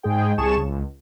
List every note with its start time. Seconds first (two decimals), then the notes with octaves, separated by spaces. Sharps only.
0.03 G#2 G#3 G#4 G5
0.38 C2 G#4 A5 C#6 E7
0.57 C#2